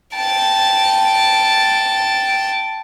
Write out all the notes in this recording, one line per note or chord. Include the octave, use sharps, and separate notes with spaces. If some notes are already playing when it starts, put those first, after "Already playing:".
G5 A5